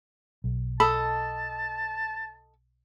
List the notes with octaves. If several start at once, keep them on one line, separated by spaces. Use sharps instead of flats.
B1
A4 D#5 A5 B5